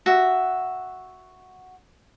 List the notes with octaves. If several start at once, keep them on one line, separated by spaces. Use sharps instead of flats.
F#4 E5